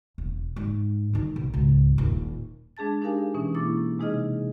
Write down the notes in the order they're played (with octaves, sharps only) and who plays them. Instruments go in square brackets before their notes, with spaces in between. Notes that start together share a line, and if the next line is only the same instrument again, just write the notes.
[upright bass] E1
G#2
D#3 D#4
B1
C#2 G#2
D#1 A#1
[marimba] G#3 D4 G#4 A5 A6
D4 D#4 G4 A#4 F5 G#5
B2 E3 C#4
A#3 E4 C#6 D6 A6
C3 G#3 D#4 G#4 D#5 F6